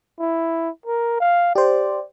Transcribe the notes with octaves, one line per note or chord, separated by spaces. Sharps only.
E4
A#4
F5
G4 C5 D5